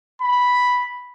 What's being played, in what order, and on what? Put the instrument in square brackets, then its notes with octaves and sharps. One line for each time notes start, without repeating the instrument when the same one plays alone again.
[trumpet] B5